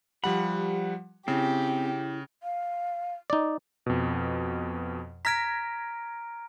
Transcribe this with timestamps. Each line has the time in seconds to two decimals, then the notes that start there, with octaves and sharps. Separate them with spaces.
0.24 F3 G3 G4 F#5 B5
1.28 C#3 C4 E4 G4
2.43 F5
3.30 D#4 D5
3.86 F2 B2
5.25 A#5 F6 G#6 A#6 B6 D7